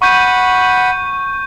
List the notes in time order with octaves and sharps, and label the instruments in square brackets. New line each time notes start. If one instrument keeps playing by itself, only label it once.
[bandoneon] F#5 B5 [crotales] C#6 G6 D#7